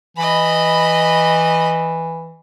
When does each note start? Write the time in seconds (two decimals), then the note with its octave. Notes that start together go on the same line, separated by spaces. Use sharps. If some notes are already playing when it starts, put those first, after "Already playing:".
0.17 E3 D#5 B5